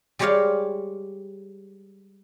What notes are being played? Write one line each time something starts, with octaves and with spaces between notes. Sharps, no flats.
G3 G#3 G4 C#5 D5 F5